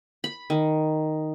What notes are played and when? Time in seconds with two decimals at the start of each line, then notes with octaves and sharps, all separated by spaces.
0.24 B5
0.50 D#3